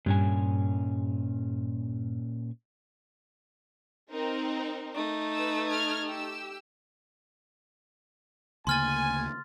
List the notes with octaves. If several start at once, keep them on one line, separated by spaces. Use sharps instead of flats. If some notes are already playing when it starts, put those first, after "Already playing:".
G2 A#2 C#4 G#5
C4 D#4 A#4
A3 D#4
B4 E6
F6 G#6
G4 E6
D2 C#3 A#3 G#5 C6 F6 A6